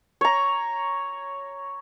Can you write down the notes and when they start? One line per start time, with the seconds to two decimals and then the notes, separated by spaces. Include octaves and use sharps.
0.21 C#5 A#5